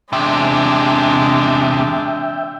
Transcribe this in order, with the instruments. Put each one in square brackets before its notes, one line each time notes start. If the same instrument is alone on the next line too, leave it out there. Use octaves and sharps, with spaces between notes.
[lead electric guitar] E2 C3 [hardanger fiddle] G#3 D4 [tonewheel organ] E5 G5